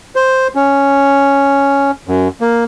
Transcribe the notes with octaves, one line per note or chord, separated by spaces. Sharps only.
C5
C#4
F#2
A#3